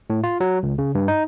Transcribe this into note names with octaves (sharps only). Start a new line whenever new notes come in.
A2
F4
F#3
C#2
C#3
G2
D#4